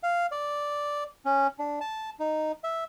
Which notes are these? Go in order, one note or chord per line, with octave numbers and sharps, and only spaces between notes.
F5
D5
C#4
D4
A5
D#4
E5